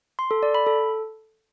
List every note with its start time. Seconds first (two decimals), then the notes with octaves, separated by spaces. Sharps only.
0.19 C6
0.31 A4
0.43 D5
0.55 B5
0.66 A4